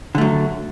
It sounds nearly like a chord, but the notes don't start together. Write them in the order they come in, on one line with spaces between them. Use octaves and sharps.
D3 A3 F#3